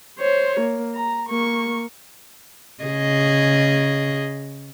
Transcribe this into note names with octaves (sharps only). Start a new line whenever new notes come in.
C5 C#5
A#3
A#5
A#3 C#6
C#3 G#4 D#5